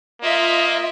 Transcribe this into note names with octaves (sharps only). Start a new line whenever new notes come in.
A#3 F4 D#5 E5